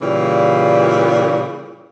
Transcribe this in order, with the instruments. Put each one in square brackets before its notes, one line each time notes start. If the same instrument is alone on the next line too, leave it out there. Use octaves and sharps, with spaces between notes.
[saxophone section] A#2 C#3 E3 G3